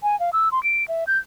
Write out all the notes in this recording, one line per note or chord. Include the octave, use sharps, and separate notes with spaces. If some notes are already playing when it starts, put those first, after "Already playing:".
G#5
F5
E6
C6
D7
E5
G6